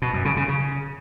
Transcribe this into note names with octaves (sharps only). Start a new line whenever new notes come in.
B2
F#2
C#3
C#3
C#3